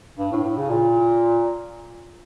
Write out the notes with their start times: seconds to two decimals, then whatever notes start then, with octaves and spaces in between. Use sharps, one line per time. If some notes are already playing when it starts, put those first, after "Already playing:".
0.19 G2
0.32 A2
0.44 A2
0.57 C#3
0.70 A#2